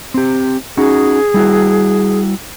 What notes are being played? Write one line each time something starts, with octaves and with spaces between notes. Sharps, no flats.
C4 G4
C#4 D#4 F#4 G#4
G3 E4 F#4